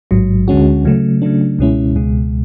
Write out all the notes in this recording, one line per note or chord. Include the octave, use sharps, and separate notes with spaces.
A1 G#2 F#3
D2 D3 G#3 C#4 F#4
C#3 F#3 A3
C#3 F#3 A3 D4
C#2 B2 G#3 C#4 E4
C#2 B2 G#3